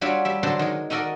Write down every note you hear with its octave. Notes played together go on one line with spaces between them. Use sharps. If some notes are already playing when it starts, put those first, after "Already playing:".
G3 D4 F4 F#4 C#5 E5
G3 E5
D3 F#3 G#4 C5 A5 C6
D#3 G#3
D#4 F#4 A4 A#4 D5 D#5